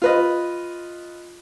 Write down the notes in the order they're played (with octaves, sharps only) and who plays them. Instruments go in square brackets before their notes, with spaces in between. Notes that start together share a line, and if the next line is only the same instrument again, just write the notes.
[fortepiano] F4 B4 D#5